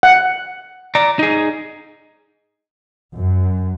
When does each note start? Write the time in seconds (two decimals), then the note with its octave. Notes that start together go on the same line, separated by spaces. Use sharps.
0.03 F#5
0.95 D5 A#5
1.19 D#4 G#4
3.14 F#2